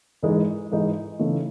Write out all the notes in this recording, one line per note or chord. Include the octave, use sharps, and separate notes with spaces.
G#2 E3 G#3 D#4
G#2 E3 G#3 D#4
C#3 E3 A3 D#4